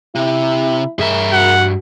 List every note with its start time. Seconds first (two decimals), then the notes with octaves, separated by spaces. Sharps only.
0.15 C3 E4
0.99 G2 G#4 A#4 E5
1.33 F#4 F#5